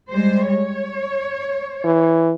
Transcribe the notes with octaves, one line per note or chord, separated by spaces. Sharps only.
G3 G#3 C5
C#5
E3